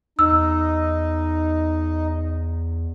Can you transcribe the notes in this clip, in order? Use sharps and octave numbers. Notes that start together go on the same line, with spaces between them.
E2 D#4 E6